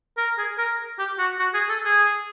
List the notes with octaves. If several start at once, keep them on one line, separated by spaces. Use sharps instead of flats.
A#4
G#4
A#4
G4
F#4
F#4
G#4
A4
G#4